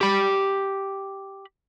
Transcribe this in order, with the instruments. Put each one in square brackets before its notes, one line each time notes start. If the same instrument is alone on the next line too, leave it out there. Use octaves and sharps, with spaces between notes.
[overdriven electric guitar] G4 B5